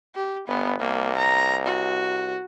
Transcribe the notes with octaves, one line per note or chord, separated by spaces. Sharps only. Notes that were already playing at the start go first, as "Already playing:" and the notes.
G4
G1 B3
C2 A#3
A#5
F#4